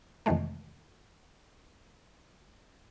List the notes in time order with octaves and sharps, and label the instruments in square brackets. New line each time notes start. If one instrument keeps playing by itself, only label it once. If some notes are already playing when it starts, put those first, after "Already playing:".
[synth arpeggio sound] F2 C3 D#3 E3 G#3 A3